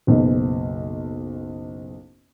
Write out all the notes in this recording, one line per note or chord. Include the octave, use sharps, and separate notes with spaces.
F#1 B1 B3